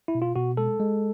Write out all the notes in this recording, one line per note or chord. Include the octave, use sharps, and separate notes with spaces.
E4
B2
F4
B2 F#4
G#3 A4
G#3